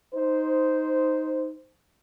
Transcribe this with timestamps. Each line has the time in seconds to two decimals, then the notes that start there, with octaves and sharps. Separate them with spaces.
0.13 D#4 C5